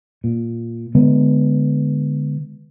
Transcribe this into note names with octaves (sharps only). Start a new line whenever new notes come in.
A#2
D3 G#3 B3